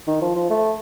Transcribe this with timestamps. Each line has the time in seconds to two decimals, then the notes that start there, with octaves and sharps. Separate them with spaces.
0.07 D#3
0.22 F3
0.36 F3
0.50 A3